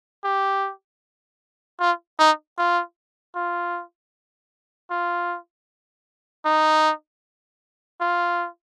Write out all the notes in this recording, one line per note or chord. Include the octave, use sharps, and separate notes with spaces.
G4
F4
D#4
F4
F4
F4
D#4
F4